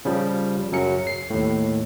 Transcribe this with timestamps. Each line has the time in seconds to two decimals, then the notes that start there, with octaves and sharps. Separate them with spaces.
0.05 C#3 F3 G3
0.72 F#2 C#3 F#3 C#4 C#7
1.07 C7
1.30 D#2 A2